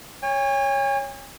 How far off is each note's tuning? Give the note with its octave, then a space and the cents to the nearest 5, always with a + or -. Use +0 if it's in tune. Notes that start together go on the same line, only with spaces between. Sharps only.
C#5 +0 G#5 -45